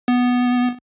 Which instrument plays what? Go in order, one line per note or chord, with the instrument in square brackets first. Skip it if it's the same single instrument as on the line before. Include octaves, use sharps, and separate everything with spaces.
[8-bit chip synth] B3